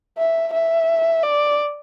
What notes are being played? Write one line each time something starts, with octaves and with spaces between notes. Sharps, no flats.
E5
E5
D5